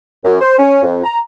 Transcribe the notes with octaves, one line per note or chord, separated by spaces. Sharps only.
F#2
C5
C#4
F2
A#5